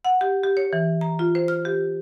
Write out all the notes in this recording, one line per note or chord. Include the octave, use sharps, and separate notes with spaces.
F#5
G4
G4
C#5
E3
A#5
F4
C5
F6
G4